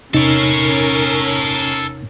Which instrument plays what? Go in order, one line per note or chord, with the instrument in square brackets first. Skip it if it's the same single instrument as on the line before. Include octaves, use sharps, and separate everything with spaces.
[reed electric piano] E2 C3 D#4 [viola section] C#4 A#4 [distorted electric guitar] A4 C#5